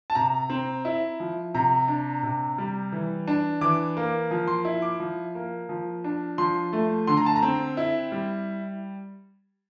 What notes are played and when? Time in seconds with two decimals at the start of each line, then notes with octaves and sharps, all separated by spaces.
0.10 A5
0.15 C3 A#5
0.50 C4
0.85 E4
1.20 F3
1.55 C3 A#5
1.88 D4
2.23 C3
2.58 G3
2.92 E3
3.27 D4
3.61 E3 D6
3.97 A#3
4.31 F3
4.47 C6
4.65 E4
4.82 D6
5.00 F3
5.35 A#3
5.69 F3
6.04 D4
6.38 F3 C6
6.73 A3
7.07 D3 C6
7.17 A#5
7.26 A5
7.36 A#5
7.42 C4
7.77 E4
8.12 G3